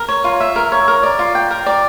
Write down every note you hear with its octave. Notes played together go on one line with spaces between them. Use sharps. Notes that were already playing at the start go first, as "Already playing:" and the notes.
Already playing: A#4
C#5
F4
E5
A#4
C#5
A#4
D5
F4
G5
A#4
D5